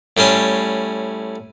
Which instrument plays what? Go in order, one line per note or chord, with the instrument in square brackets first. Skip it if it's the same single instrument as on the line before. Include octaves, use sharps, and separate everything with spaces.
[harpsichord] A2 G3 C#4 C6